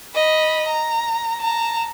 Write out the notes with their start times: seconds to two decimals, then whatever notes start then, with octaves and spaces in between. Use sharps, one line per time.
0.15 D#5 B5
0.68 A#5
1.40 A5 A#5